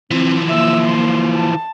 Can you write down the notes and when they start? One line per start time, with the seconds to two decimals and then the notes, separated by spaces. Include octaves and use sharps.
0.11 E3 F3 C4
0.49 A#3 E5 E6
0.88 C6
1.36 A5